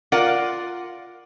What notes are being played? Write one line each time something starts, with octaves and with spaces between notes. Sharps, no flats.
F4 A#4 D5 F#5